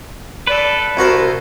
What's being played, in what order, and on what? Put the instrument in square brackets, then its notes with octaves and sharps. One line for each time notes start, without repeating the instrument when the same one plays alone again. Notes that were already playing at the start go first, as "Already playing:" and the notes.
[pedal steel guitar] A4 B4 [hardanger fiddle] D5
[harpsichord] C2 F#4 A#4 [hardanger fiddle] C5